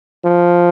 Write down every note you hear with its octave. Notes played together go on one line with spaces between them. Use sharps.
F3